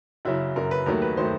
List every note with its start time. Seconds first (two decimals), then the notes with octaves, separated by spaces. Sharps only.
0.25 F#2 C#3 F#3 E4
0.56 F#2 C#3 F#3 A#4
0.71 B4
0.86 D#2 D#3 F#3 A3 A#4
1.02 B4
1.17 D#3 F#3 A3 C5